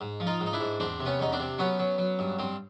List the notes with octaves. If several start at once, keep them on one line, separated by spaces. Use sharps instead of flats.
G#2
F3
D#4 F4
G#2
D#4
D4 E4
G#2
E2 C4 D4
C3
B3 C#4
E2 D#4
C4 D4
C3
F#3 B3 C#4
F#3
F#3
G2
G2 C4